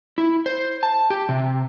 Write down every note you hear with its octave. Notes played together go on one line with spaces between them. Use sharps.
E4
C5
A5
G4
C3